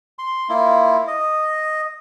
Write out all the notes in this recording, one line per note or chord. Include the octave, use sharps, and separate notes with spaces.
C6
A#3 E4 F4
D#5